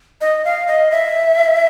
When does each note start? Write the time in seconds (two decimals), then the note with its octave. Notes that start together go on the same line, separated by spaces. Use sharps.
0.21 D#5
0.45 F5
0.68 D#5
0.91 E5